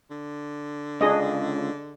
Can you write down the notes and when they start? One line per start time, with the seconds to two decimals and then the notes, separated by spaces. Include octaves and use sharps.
0.10 D3
1.01 C#2 D4 G#4 D#5